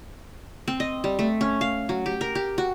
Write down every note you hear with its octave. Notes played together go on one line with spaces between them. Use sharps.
C4
D#5
G3
A3
C#4
F5
F#3
G4
A#4
G4
F#4